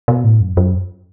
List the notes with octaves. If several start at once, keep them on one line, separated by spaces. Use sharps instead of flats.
B2
A2
F#2
F#2